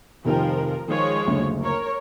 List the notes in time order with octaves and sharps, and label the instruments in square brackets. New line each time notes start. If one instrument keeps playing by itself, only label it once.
[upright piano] F1 D#3 G5 [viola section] F3 A#4
[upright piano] D#3 [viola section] F3 G#3 C#5
[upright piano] F#1 D2
[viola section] A#4 C#5